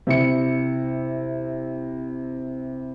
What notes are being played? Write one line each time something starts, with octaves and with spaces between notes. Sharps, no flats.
C3 E4 C#7